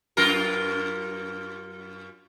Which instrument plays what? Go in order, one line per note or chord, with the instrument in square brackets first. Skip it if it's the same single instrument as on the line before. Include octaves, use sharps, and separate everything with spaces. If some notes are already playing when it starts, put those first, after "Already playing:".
[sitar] F#2 F4 A#4